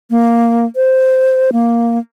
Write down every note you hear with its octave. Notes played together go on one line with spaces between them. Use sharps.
A#3
C5
A#3